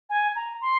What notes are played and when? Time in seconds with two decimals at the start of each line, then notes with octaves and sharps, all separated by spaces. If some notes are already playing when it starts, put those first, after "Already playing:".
0.10 G#5
0.35 A#5
0.61 C6